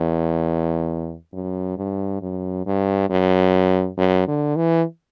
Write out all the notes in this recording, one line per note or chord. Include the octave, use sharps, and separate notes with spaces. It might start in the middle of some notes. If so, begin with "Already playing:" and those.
Already playing: E2
F#2
G2
F#2
G2
F#2
F#2
D3
E3